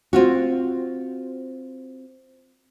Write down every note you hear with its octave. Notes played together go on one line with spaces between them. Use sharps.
C4 F4 F#4